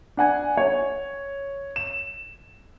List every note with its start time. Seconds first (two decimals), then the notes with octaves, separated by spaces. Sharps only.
0.17 D4 F#5 G#5
0.57 C#5
1.76 E7